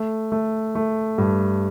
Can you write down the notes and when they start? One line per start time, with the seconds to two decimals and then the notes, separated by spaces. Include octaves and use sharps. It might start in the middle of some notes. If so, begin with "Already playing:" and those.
Already playing: A3
0.32 A3
0.75 A3
1.18 G2